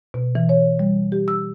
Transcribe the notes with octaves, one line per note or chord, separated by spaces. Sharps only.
B2
E3
C#5
G3
G4
E6